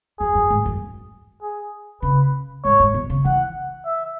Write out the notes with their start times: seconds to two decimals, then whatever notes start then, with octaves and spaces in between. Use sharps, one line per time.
0.20 F#2 G#4
0.35 F#2
0.50 G#2
0.65 F#2
1.42 G#4
2.02 C#3 B4
2.64 G#2 C#5
2.80 G#2
2.94 B2
3.10 C#3
3.25 E3 F#5
3.86 E5